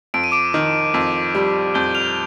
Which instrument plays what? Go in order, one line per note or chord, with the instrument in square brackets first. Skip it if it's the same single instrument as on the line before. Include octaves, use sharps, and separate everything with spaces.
[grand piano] F2 [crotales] D7
[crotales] D#7
D6 D7
[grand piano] D#3
F2
G3
[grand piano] F2 [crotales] G6 G7
[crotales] F6 F7